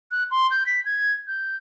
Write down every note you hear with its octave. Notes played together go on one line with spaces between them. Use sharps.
F#6
C6
G6
B6
G#6
G6